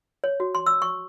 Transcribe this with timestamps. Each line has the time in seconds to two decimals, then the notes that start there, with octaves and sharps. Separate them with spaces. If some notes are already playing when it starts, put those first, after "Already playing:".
0.24 C#5
0.40 F#4
0.55 C6
0.66 E6
0.82 C#6